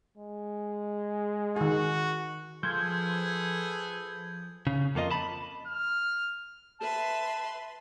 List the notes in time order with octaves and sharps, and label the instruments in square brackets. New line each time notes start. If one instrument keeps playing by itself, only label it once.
[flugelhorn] G#3
[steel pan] D#3 G#4 [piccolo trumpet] F#4
[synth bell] F3 [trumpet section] G#4 A4 B4 [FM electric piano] G6 G#6
[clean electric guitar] C#3
F2 A#3 F4 D#5
A5 B5
[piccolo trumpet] F6
[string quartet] B4 E5 C6 [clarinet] A5